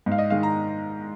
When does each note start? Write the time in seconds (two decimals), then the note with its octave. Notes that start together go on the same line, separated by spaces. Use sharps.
0.06 G#2
0.12 F5
0.18 D#5
0.30 D#3 G#3 F5
0.43 A#5